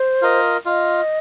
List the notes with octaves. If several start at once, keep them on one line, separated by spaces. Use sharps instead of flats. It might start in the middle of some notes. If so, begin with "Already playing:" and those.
Already playing: C5
F4 A#4 D#5
F4 D#5